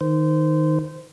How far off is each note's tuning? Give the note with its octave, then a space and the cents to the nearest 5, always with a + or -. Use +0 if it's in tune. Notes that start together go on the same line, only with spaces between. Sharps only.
D#3 +0 C5 -20